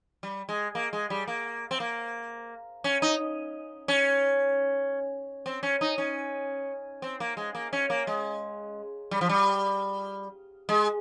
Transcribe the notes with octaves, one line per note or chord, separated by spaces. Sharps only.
G3
G#3
A#3
G#3
G3
A#3
C4
A#3
C#4
D#4
C#4
C4
C#4
D#4
C#4
C4
A#3
G#3
A#3
C#4
A#3
G#3
G3
F3
G3
G#3